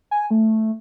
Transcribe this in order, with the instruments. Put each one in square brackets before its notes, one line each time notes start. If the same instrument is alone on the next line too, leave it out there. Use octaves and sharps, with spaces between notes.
[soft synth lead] G#5
A3